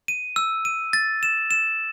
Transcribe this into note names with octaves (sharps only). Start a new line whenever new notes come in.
D#7
E6
D#7
A6
E7
E7